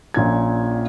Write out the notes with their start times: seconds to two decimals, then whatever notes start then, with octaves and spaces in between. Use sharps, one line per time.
0.14 A#1 A#2 C#4 G#6